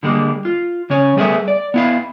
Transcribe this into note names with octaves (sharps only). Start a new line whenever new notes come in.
D3 G3 G#3 A#3
F4
C#3 C#4 C#5
G3 A3 B3 G#4 A#4 E5
D5
B3 E4 F5